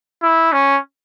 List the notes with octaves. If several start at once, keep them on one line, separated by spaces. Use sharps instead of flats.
E4
C#4